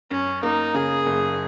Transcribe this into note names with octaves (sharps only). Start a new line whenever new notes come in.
F#2 C#4
A#3 D#4
C#3 G#4
F#1